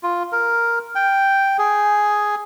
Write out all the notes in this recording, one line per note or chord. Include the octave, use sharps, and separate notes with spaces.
F4
A#4
G5
G#4